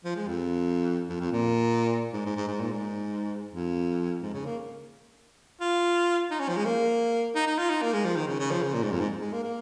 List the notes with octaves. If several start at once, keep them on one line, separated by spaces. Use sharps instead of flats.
F3
G#3
F2
F2
F2
A#2
G#2
G#2
G#2
G#2
A#2
G#2
F2
G#2
C#3
A#3
F4
D#4
C#4
F3
G#3
A#3
D#4
D#4
F4
D#4
A#3
G#3
F3
D#3
C#3
C#3
F3
C#3
A#2
G#2
F2
G#2
G#3
A#3
A#3